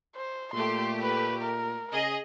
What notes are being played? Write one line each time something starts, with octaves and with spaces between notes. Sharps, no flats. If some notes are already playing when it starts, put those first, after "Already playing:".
C5
A#2 A3 G4 C6
B4
A#4
C#3 G#4 D#5